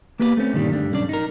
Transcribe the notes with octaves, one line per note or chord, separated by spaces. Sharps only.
A#3 B3 G4 B4 C#5 D5
A3 C4 C#4
G2 A#2 D3 D#3 G3
D2 G2 D3 G3
B1 G2 C#4 D4 D5
D#4 A#4